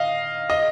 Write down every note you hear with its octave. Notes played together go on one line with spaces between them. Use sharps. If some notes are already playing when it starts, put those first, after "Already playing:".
Already playing: D#5 F5
D#5